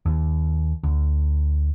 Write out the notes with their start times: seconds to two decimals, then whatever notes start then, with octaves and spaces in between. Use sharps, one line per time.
0.06 D#2
0.83 D2